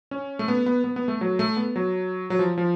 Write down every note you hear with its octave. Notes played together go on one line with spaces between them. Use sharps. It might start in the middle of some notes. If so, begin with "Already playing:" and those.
C#4
A3
B3
B3
B3
B3
A3
F#3
A3
B3
F#3
F#3
F3
F3